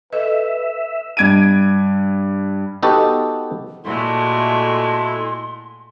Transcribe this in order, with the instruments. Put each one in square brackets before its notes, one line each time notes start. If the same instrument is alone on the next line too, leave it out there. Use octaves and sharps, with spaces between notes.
[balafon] A4 D#5 [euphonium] B4 [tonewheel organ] E5
[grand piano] G2 G#6 D7 D#7
[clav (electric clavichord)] B3 D#4 F#4 G4 A4
[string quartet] A#2 G#3 A3 [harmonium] E4 F#4 A4 [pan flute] C6